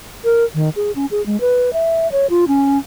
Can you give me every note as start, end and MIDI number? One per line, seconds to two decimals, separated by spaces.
0.24 0.44 70
0.55 0.70 51
0.76 0.91 68
0.96 1.06 61
1.11 1.24 68
1.26 1.40 56
1.41 1.73 71
1.73 2.10 76
2.12 2.26 73
2.30 2.45 65
2.48 2.78 61